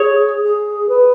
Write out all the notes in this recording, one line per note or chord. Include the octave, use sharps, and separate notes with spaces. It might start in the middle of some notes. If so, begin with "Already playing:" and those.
Already playing: G#4 C#5
G#4
B4